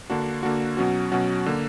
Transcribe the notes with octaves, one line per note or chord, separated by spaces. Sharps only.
D3 A#3 D4 F#4
D3 A#3 D4 F#4
B2 F#3 C#4 F#4
B2 F#3 C#4 F#4
D3 A#3